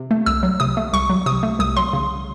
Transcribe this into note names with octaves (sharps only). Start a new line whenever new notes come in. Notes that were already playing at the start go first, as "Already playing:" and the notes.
Already playing: C3
A3
C2 E6
F#3
C3 D#6
A3
C2 C#6
F#3
C3 D#6
A3
C2 D#6
F#3 C6
C#3